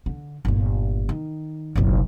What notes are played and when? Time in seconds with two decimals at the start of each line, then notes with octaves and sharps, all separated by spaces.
0.06 D3
0.45 G1 A#2
1.09 D#3
1.75 F#1 B1